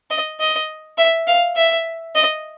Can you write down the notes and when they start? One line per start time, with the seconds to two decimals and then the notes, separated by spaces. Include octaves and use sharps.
0.11 D#5
0.40 D#5
0.98 E5
1.28 F5
1.56 E5
2.15 D#5